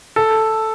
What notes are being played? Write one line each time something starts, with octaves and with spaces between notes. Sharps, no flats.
A4